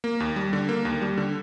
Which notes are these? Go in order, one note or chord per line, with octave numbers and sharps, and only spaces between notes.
A#3
D#2
G3
D3
A#3
D#2
G3
D3